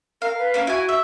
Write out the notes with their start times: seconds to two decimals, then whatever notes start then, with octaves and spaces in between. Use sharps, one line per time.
0.22 A#4 F5
0.38 B4
0.54 A#3 C#4
0.67 E4 F#4 G#5
0.89 E5